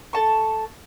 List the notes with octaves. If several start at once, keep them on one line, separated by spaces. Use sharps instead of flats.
A4 A5 C#6